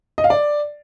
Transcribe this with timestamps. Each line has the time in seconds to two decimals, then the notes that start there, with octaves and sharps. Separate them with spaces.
0.18 D#5
0.24 F5
0.30 D5